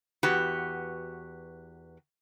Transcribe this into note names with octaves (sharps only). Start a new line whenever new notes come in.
E2 F#4 G4 B4